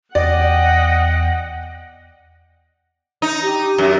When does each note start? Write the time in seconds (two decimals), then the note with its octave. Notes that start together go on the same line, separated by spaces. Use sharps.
0.15 E2 D5 D#5 F#5 G5
3.22 D#4
3.43 G4
3.78 F#2